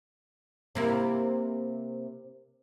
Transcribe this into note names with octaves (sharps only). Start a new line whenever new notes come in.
C3 A#3 E4